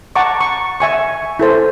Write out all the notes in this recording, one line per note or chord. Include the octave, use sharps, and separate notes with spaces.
F#5 A5 A#5 C#6 D6
C#6
E5 G#5 C#6
E4 A4 C5